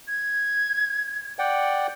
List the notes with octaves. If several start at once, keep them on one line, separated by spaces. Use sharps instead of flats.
G#6
D5 F#5 G5